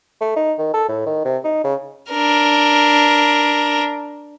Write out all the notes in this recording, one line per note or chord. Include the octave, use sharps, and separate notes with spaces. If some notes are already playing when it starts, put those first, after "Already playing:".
A3
D#4
D#3
A4
A2
D#3
C3
D#4
C#3
D4 A#4